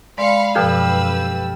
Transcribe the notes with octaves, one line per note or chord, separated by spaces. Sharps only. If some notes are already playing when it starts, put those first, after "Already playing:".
G#3 D5 F5 B5 C6 C#7
F#2 B2 F3 G4 A4 B4 F5 E6